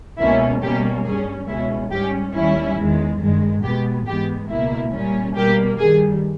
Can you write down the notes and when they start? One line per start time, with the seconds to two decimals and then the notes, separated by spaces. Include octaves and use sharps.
0.19 C#2 B2 A#3 C#4 E4
0.62 B2 G3 A#3 C#4 G4
1.05 G2 G3 C#4 G#4
1.48 C#2 B2 G#3 C#4 E4
1.91 G#2 G3 C#4 G4
2.34 D#2 D#3 G3 C#4 E4
2.77 E2 D#3 G#3
3.20 G2 D#3 G#3
3.63 B2 G#3 B3 G4
4.06 G#2 E3 G#3 B3 G4
4.49 C#2 B2 A#3 E4
4.93 A#2 G3 C#4
5.35 B2 G3 A#3 G4
5.78 G2 D#3 G3 G#4